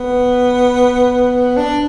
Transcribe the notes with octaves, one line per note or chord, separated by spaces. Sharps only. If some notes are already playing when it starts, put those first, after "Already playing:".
Already playing: B3
D4